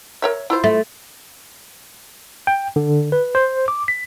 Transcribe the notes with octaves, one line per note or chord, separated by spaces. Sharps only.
A#4 C#5 E5
E4 F4 C5
A3
G5
D3
B4
C5
D6
B6